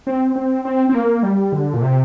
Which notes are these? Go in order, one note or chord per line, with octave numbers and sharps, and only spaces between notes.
C4
C4
C4
C4
A#3
G3
D3
A#2
C3